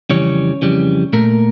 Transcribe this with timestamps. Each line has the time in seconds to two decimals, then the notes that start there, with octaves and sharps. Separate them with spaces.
0.09 F2 C#3 E3 G3 C#4 C#5
0.62 F2 C#3 E3 G3
1.13 A#2 A3 A#3 A#4